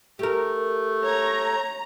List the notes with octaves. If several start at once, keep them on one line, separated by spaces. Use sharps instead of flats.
A3 G4 A#4
C#5 A#5